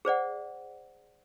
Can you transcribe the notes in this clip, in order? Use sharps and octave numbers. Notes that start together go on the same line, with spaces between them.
G#4 C5 D5 F#5